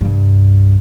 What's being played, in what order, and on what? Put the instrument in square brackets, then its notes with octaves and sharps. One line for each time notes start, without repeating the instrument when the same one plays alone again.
[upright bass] C2 G2